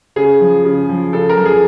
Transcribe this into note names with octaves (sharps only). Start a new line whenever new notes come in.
C#3 G#4
F3
C#3
F3
C#3 A4
A#4
F3
G#4